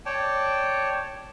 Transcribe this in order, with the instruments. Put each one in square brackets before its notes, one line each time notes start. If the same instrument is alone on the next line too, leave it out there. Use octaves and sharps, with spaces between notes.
[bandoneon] C#5 D5 G5 A5